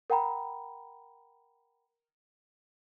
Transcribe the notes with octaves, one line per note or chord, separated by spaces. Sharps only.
A#4 F#5 G5 A#5 B5